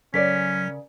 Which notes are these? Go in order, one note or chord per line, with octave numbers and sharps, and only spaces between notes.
C#3 F#3 C#4 A#4 C#5 D5 B6